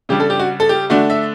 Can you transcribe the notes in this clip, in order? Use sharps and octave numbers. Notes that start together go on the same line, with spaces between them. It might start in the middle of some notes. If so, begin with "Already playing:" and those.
C#3 G3 D4 G4
A4
G4
F#4
A4
G4
D3 A3 D4 F#4
E5